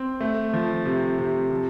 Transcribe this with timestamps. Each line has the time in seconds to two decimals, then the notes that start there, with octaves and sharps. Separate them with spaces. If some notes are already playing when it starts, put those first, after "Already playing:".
Already playing: C4
0.20 A3
0.53 F3
0.86 C3
1.19 C3
1.51 F3